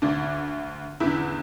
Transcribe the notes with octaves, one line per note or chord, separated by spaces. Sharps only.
D2 D3 D4
E2 E4
D3